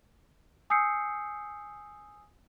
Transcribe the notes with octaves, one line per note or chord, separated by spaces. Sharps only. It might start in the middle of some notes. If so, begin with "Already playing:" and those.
G#5 D#6 E6 G6 C7 C#7